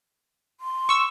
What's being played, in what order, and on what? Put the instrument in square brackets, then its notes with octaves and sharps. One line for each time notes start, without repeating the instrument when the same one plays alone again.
[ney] C6
[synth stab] C#6 E6